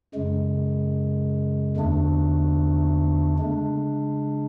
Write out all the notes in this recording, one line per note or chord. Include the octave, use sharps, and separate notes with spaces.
F#2 C#3 G#3
E2 D3 A3 D4
C#3 G#3 D4